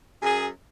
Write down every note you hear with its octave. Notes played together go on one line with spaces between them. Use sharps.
F#2 G#4